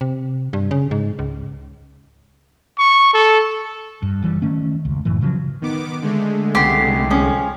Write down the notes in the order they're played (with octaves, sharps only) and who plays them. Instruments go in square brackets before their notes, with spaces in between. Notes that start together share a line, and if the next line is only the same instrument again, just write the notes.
[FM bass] C3
G2
C#3
G#2
C#2
[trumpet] C#6
A4
[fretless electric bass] G2
F#1 E3 G3
D#3 A3 C#4
F1 C#2
G#1 F#2 A2 E3
C#3 F3 F#3
[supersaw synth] D#3 B3 D6
D3 G#3 A3
[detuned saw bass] C2 [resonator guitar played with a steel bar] C#3 B3 [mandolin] G4 C6
[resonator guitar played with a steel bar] F3 C#4